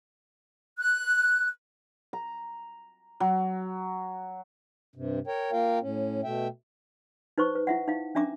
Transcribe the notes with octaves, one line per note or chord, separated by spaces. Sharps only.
F#6
A#5
F#3
G2 C3
A#4 C#5 G5
A#3 F4 A#4 F5 G5
A2 C#4
B2 A3 E5 G5
D#4 B4 C5 C#6
B4
E4 E5 F#5
D#4 F5
C#4 D4 E5 A#5 D6